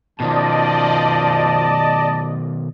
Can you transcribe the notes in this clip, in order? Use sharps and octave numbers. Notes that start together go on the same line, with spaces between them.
B2 D#3 F3 D5 D#5 A5